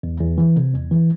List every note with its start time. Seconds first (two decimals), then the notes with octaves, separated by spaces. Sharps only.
0.03 E2
0.21 E2
0.38 E3
0.56 C3
0.74 E2
0.91 E3